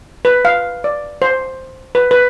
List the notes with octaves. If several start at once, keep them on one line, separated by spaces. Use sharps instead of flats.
B4
F5
D5
C5
B4
B4